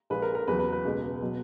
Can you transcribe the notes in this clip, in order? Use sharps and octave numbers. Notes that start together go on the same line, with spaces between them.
A#1 A#2 G#3 B4
A#4
A#4
E2 C#3 F#3 B4
B4
B4
C#2 B2 G#3
B2 F#3